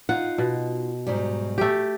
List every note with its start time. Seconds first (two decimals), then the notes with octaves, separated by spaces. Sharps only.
0.09 D#4 F4 F#5
0.38 B2
1.07 G#2 F#3 G3
1.58 A3 G4